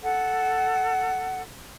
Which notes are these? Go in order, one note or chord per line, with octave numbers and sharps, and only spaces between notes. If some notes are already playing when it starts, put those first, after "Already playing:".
A4 F#5